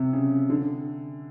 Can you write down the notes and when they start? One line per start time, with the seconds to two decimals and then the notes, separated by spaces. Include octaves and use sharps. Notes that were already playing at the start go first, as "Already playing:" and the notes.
Already playing: C3
0.13 C#3
0.50 D3